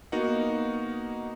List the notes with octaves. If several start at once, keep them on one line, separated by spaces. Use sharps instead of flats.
A#3 B3 D#4 F#4 A#4 F#5